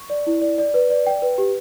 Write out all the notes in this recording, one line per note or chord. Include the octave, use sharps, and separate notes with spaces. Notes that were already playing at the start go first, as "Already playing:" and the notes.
Already playing: C#6
D5
E4
D5
D5
B4
D5
G5
B4
G4